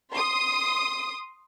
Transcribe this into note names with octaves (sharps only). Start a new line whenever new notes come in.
C6 D#6